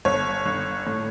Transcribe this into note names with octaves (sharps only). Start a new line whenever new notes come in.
G1 C#5
G1
A2